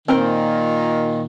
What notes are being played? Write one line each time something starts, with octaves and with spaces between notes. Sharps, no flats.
A#2 D#3 C4 A#4 C5